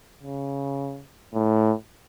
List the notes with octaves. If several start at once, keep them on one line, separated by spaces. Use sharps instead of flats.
C#3
A2